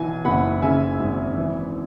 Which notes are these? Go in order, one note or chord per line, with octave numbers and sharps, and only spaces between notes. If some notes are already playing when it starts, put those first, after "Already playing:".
Already playing: B1 E3 G#5
F#1 F#5 B5
C#3 E5 G#5
G#1
E3